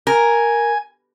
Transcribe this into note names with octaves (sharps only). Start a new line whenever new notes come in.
A#4 G#5